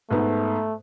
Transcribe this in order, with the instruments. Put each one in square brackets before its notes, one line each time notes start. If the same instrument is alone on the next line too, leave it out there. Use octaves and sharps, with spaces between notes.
[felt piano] G#2 B3 [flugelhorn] A3